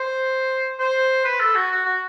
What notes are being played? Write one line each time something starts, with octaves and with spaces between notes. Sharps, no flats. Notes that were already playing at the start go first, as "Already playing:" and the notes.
Already playing: C5
C5
B4
A4
F#4
F#4
F#4